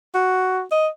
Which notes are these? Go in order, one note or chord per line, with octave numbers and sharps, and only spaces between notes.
F#4
D#5